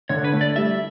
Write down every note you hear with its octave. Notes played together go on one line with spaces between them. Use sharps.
D3 C#5
B4
A3
D5
G3 E5